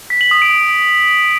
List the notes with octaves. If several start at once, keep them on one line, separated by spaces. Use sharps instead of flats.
B6
F#7
D#6
D7